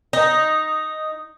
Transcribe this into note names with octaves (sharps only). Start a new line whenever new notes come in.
D#4